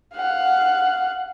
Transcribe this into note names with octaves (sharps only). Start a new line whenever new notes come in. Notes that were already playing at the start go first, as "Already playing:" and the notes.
F5 F#5